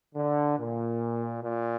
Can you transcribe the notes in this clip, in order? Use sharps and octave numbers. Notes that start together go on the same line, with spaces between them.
D3
A#2
A#2